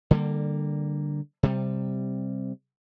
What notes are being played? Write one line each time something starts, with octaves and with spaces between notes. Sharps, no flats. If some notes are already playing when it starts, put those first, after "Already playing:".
D3 G3 A#3
C3 G3